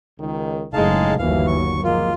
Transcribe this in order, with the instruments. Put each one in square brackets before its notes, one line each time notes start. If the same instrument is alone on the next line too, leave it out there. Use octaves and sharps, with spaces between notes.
[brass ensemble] C#2 D#3
[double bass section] F#1 [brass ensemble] A2 G#3 [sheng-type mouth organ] D#4 F5 A5
[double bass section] G1 D#2 F#3 [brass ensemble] E3 [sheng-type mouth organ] F5
[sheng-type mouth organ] C#6
[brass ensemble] F3 G#3 A#3 [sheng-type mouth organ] F4